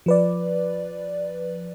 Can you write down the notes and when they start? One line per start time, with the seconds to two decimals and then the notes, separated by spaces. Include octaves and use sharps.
0.06 F3 B4 D5